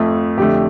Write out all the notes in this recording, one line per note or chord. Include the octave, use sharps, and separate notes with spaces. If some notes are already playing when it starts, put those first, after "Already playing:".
Already playing: F2 F3 A3
F2 D3 A3 G4